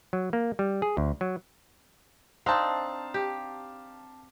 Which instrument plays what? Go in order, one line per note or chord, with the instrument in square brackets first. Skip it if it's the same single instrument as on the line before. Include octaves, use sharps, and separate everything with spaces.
[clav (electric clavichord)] F#3
A#3
G3
G#4
D2
F#3
[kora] C4 D4 D#4 [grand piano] F5 A5
[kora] G4